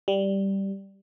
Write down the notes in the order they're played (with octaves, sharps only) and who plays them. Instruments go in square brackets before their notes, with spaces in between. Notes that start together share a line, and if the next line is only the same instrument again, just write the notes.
[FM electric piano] G3